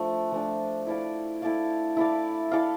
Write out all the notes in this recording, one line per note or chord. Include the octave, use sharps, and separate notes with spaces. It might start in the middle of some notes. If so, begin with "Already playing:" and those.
Already playing: F3 A3 D4
F3 A3 D4
E4 A4 D5 F5
E4 A4 D5 F5
E4 A4 D5 F5
E4 A4 D5 F5